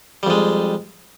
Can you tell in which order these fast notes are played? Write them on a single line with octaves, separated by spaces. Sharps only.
G3 F2 G#3